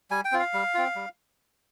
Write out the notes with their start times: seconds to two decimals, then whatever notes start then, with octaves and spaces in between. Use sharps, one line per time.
0.11 G3 G#5
0.25 G5
0.32 C4 F4
0.39 F5
0.54 G3
0.74 C4 F4
0.96 G3